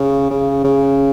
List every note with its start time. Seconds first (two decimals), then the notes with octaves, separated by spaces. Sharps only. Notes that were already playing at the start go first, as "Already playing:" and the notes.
Already playing: C#3
0.30 C#3
0.64 C#3